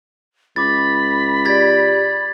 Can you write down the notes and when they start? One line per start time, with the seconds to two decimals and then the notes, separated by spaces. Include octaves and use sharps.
0.56 C#2 B5 D6 A6
1.45 G4 D5 G#6 A6 B6